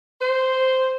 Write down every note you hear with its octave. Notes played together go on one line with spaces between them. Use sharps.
C5